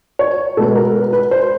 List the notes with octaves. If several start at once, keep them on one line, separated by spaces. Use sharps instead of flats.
C#5
B2 G#3 B3 A4
A#4
B4
B4
C5